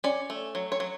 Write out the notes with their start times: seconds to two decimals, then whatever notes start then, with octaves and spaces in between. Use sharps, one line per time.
0.04 C#4 D5
0.30 A3
0.55 F#3
0.72 C#5
0.80 F#3